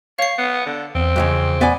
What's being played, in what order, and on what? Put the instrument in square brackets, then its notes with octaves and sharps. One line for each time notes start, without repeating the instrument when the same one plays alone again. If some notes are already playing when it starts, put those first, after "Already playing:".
[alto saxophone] C#5 [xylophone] F5 C7
[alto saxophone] B3
D3
[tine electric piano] E2 [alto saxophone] C4
[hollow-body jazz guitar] F2 A2 C#3
B3 D5 G#5